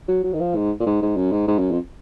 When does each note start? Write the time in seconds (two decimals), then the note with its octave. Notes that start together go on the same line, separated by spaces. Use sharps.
0.08 F#3
0.24 F#3
0.33 D#3
0.40 F3
0.55 G#2
0.80 A#2
0.86 G#2
1.02 G#2
1.17 F#2
1.32 G#2
1.47 G#2
1.59 F#2
1.71 F2